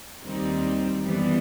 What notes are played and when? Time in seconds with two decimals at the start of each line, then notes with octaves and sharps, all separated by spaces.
0.23 D#2 D#3 G3 C4 D#4
1.02 F#2 E3 G3 B3